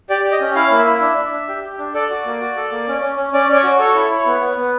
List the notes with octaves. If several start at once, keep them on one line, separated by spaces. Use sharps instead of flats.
G4 D5
G4
D#5
C#4
E4 F5
A#3
E5
E4
D4
D4
D4
G4
G4
D4
A4 D5
F#4
A#3
F#4
A4
A#3
C#4
C#4
C#4
C#4 D5
C#4 D5
C#5
F#4
A4 C#5
E4
E4
B3
B3
B3